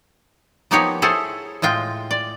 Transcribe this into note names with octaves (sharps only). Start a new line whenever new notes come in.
F3 A#3 B3 D#4 G4 C#5
E4 G#4 A4 C5 C#5
A2 G#3 F4 G5
D5